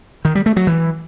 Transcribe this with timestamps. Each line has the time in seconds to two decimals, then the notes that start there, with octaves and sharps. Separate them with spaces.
0.25 D#3
0.35 G3
0.46 A3
0.57 F#3
0.67 E3